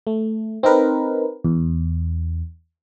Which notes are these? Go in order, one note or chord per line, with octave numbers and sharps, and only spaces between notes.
A3
C4 D#4 A#4 B4
E2